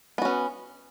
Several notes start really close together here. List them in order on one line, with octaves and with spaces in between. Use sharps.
B3 F#4 C#4